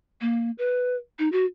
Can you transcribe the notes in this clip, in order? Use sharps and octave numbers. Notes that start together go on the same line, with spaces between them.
A#3
B4
D#4
F#4